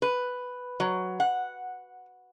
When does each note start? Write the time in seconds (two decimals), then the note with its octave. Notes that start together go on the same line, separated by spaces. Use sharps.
0.02 B4
0.80 F#3
1.20 F#5